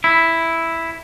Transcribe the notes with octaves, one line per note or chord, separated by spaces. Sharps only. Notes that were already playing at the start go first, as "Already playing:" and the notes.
E4